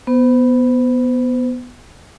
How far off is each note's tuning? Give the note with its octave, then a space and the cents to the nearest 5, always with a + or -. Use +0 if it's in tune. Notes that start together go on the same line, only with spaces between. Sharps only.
B3 +0 C5 -30